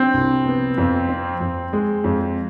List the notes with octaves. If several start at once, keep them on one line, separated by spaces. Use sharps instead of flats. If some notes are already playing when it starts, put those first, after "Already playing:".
Already playing: C4 D4
C2
B3
F2
C4
F2
G#3
F2